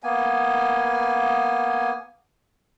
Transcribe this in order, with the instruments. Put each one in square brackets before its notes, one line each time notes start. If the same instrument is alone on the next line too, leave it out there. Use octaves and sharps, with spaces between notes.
[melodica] A#3 B3 G#5